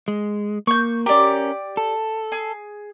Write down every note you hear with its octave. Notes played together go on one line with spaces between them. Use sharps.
G#3
A#3 C#6 G6
C#4 G4 A#4 D5
A4
G#4